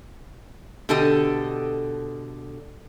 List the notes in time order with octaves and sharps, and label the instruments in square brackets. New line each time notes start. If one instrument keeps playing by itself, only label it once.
[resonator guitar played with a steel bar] B2 D3 G4 A4 D#5